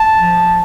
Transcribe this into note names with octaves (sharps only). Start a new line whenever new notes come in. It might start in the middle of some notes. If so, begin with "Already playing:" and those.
Already playing: A5
F3